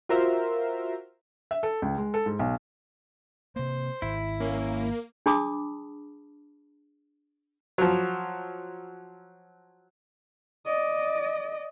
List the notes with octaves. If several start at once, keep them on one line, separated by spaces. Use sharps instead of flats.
F4 F#4 A#4 C5 E5
E5
A4
C#2
G#3
A4
G#2
B1
C3 A#3 C5
G#1 E4
A#3 C#4
D4 G#4 A5 B5 D6 D#6
F3 F#3
D5 D#5